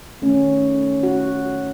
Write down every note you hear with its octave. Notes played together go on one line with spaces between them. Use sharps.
D#3 A3 C#4
F#4